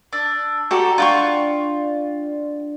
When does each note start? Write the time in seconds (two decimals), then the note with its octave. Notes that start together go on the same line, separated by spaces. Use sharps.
0.13 D4 E6
0.71 F#4 G4 A4 D5 A#5
0.98 D4 F4 D5 F#5 G5 C#6